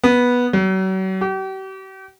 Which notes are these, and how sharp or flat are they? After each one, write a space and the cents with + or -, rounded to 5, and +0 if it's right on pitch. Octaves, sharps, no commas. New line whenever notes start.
B3 -10
F#3 +40
G4 -40